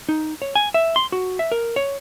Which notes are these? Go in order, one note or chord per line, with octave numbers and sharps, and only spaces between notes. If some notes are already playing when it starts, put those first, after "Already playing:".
D#4
C#5
G#5
E5
C6
F#4
E5
A#4
C#5